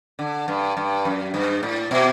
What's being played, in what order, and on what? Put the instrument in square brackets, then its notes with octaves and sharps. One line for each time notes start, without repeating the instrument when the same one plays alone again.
[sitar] D3
G2
G2
F#2
G2
A2
B2